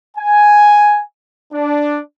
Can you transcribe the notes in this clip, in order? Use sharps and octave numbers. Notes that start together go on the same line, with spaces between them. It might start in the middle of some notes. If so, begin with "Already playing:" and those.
G#5
D4